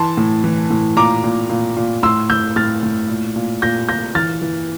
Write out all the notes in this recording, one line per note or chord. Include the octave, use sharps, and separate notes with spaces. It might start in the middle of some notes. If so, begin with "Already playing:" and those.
Already playing: E3 A5 C6
A2
E3
A2
A#2 A#5 D6
A#2
A#2
A#2
A2 C6 E6
A2 E6 G6
A2 F6 A6
A2
A#2
A#2
A#2 G6 A#6
A#2 G6 A#6
E3 F6 A6
E3